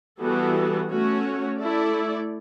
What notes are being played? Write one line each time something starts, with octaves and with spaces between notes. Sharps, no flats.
E3 G3 B3 F#4 A4
A3 C#4 F#4 C#5
A3 E4 A4 D5